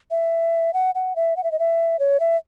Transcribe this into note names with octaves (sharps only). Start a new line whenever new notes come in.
E5
F#5
F#5
E5
F#5
E5
D#5
E5
C#5
E5